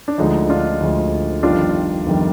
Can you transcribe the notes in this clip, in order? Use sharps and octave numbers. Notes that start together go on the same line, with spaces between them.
D4
D2 D3 F3 G#3 D#4
D4 F4
D2 D3 F3 G#3
G1 F2 D#3 G3 D4 F4
G1 F2 D#3 G3